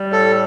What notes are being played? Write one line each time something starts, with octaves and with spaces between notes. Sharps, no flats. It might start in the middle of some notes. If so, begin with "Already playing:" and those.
Already playing: G3
A2 A4